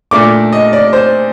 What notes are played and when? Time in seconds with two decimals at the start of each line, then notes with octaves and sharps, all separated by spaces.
0.11 A#2 A3 D4 D6
0.53 D#5
0.73 D5
0.93 C5